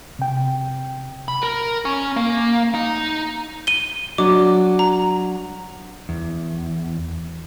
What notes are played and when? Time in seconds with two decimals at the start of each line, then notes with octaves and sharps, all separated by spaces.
0.19 C3 G5
1.28 B5
1.42 A#4
1.85 C#4
2.16 A#3
2.74 D#4
3.67 D#7 G7
4.18 F#3 D4 D6
4.79 A#5
6.09 E2